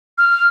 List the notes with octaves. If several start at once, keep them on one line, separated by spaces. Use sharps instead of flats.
F6